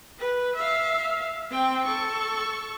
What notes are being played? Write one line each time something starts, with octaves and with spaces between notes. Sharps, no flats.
B4
E5 F5
C4 G5
A4 C#6